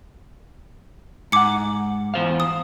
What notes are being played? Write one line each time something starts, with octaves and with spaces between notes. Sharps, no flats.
G#2 F#5 D6 C#7
E2 C5 F5
D#6